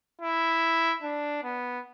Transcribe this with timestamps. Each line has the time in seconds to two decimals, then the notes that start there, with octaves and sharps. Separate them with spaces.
0.21 E4
1.03 D4
1.43 B3